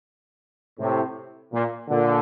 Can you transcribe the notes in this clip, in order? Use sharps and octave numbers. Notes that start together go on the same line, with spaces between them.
A2 C3
A#2
A#2 D3